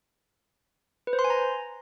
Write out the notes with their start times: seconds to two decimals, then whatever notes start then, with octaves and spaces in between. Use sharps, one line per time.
1.07 B4
1.13 C5
1.19 C6
1.24 G#5
1.30 A#5